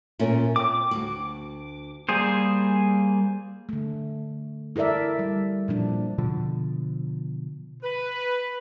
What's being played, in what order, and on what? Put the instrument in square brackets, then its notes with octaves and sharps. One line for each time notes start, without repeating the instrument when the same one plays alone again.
[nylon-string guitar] A#2 A3 C#4
[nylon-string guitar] C4 [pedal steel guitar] D6
[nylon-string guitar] D2 F#4
[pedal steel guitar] G3 A#3 G#4 C5
[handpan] D3 A3
E4 A4 A#4 D5 E5
G3
A#2 F3 D4
[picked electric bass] B2 D3 F3
[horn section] B4